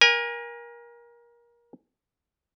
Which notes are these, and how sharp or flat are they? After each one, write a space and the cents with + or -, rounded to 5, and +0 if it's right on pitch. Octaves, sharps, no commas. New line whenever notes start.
A#4 +25 G#5 -25